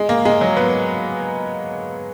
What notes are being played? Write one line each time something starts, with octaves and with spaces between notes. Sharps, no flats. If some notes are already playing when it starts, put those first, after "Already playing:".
Already playing: G#3
A#3
G#3
F#3
B3